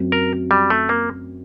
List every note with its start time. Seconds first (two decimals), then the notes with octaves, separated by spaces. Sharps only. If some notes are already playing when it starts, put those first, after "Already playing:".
Already playing: F#2 F#3 C4
0.12 A#4
0.51 G3
0.70 A3
0.89 A#3